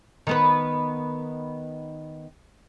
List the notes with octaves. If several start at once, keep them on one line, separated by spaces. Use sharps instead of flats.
D#3 B3 B4